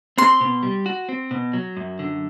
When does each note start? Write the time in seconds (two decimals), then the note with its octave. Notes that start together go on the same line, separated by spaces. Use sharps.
0.18 C4 C6
0.41 B2
0.63 G3
0.86 F#4
1.09 C4
1.31 B2
1.53 F#3
1.77 F#2
1.99 D3